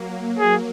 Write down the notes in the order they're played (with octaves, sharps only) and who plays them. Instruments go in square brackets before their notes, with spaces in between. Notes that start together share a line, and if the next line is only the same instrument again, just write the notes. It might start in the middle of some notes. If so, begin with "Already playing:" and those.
Already playing: [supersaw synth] F#3 A#3
[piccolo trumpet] G#4